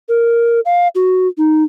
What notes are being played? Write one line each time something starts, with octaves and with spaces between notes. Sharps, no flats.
A#4
F5
F#4
D#4